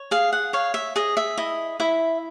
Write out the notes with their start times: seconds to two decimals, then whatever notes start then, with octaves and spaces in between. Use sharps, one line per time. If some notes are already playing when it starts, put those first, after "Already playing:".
Already playing: C#5
0.11 G#4 F5
0.32 F#5
0.53 C#5 F5
0.74 E5
0.96 G#4 D#5
1.17 E5
1.37 E4 D#5
1.80 E4 E5